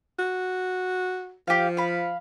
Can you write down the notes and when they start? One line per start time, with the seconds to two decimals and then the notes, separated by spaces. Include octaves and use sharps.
0.19 F#4
1.48 F3 G4 F5
1.77 F5 B5